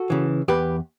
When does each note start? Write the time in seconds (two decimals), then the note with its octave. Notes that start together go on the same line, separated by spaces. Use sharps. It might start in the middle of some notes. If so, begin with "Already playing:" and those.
Already playing: F#4 A4
0.10 C#3 E3
0.48 E2 G4 B4